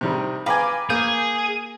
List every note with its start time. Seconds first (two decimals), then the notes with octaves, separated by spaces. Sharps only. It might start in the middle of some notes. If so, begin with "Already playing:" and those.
0.01 C3 D#3 G3
0.46 B4 D5 F5 G5 G#5 A#5
0.90 A#3 G#4 G6